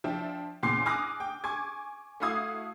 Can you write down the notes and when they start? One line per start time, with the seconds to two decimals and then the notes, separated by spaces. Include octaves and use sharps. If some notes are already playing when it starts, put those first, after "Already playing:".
0.04 F3 D4 E5 G5 A5
0.63 E2 A#2 C#3 C6 D6 C7
0.86 G#5 D6 D#6 F6 F#6 A#6
1.20 G5
1.44 G#5 C#6 D6 G#6
2.20 A3 E4 F#4 F5 D#6 G#6